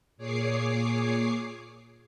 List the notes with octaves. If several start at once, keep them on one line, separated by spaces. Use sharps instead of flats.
A#2 G#4 C#5 D6 C7